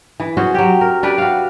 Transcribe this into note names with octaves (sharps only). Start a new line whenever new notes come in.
E3
C#4 F#4 G#4 C5
F#3 G4
A#4
D4 G4 B4 D5
F#4 F5